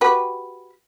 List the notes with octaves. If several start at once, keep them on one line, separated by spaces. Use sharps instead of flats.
F#4 G4 B4